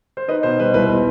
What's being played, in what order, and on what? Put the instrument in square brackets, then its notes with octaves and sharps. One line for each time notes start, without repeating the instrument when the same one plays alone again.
[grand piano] C5
D#4 B4 D#5
B2 C5
G3 B4
C2 B4
B3